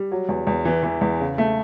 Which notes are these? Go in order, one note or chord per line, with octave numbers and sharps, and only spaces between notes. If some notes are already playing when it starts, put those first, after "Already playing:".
Already playing: G3
F#3
E2
E2
E3
E3
E2
C#3
A3